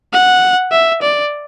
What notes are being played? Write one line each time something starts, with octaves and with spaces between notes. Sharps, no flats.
F#5
E5
D5